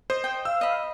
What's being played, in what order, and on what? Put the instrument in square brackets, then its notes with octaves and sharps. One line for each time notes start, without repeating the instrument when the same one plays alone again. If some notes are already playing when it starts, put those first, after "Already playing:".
[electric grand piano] C5 [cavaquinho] D#5
[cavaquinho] D#5 G5
[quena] F5 [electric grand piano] E6
[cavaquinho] D#5 B5